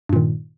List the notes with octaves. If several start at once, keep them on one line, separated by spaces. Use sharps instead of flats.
G2 A#2 D#3